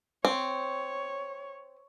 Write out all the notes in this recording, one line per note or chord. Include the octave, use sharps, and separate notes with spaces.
C4 C#5